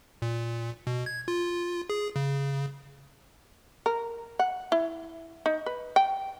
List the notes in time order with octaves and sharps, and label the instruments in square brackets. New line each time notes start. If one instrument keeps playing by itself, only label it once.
[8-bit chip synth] A#2
B2
G#6
F4
G#4
C#3
[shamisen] A#4
F#5
E4
D#4
B4
G5